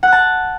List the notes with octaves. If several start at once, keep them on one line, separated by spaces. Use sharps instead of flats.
F#5 A5 F#6